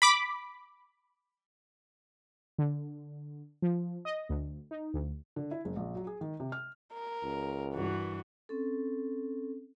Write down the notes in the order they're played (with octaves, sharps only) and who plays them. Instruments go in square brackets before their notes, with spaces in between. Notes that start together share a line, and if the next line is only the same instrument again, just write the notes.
[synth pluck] B5 D6 B6
[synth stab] D3
F3
D#5
D2
D#4
D2
[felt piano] D3
E4
F#1
A#1
F#3
G#4
D#3
C3
F6
[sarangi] A#4
[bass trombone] C#2
[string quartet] G2 E3 [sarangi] F#4
[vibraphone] C4 C#4 A4